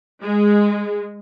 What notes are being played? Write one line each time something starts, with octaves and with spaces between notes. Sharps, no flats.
G#3